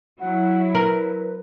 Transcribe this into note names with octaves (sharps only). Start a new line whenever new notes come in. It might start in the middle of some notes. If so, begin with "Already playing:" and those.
F#3 E4 F#5
A#4 B4